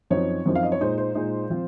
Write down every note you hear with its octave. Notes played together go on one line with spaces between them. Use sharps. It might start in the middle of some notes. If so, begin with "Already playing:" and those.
F#2 F3 C4 D#4 C#5
F#2 F3 C4 D#4
F5
D#5
C#5
A#2 G#3 D#4 C5
C5
A#2 G#3 D#4
F3 C4 F4